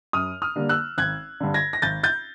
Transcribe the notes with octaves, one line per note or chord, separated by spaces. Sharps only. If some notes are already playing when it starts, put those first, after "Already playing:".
F#2 D#6 F6
D#6 F6
D3 G3 A#3 D4
E6 F#6
G#1 F#6 G#6
G2 D3
G#6 A#6
A#6
G#1 G6 A6
G6 A6